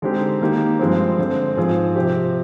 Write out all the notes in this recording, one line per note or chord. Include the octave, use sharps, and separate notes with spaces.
D3 G#3 C4 D#4 G4
D#3 A#3 D#4 G4
G2 F3 G#3 C4
D3 G#3 C4
G#2 F3 C4 F4 G#4
C3 F3 C4 G4